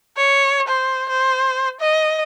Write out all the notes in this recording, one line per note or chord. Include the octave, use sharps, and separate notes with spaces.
C#5
C5
C5
D#5